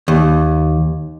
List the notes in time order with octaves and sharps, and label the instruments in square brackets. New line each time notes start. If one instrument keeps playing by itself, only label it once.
[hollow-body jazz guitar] D#2